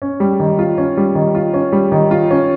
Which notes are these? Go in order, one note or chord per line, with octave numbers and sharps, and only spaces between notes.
C#4
G3
D#3
F4
C#4
G3
D#3
F4
C#4
G3
D#3
F4
C#4